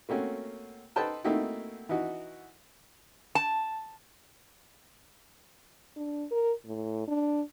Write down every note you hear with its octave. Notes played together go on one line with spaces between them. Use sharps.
A3 A#3 C4 C#4 F#4
D#4 A4 B4 C5 G5 A5
A3 A#3 C4 D#4 E4 F#4
E3 D#4 F#4
A5
D4
A#4
A2
D4